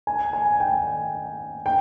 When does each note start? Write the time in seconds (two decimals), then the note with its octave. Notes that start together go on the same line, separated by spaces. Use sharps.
0.07 G#5
0.33 G#5
0.60 G5
1.66 G5